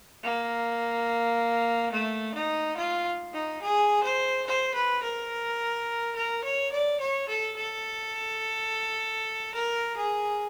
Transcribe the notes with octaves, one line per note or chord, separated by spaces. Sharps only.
A#3
A3
D#4
F4
D#4
G#4
C5
C5
B4
A#4
A#4
C#5
D5
C#5
A4
A4
A#4
G#4